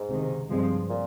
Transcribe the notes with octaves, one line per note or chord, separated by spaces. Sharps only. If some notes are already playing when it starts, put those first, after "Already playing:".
Already playing: G#2
C#2 C3 D#3
G2 F3 G#3 C4
A#2